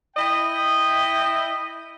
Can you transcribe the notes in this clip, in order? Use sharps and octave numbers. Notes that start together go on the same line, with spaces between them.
E4 D#5 G5